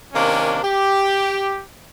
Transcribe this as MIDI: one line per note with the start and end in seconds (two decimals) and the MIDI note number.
0.13 0.58 48
0.13 0.58 51
0.13 0.58 58
0.13 0.58 61
0.13 0.58 62
0.63 1.63 67